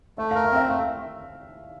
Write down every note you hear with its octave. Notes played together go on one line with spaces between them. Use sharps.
A3 E5
F5
A#4
F5
C4 E5
A3 F5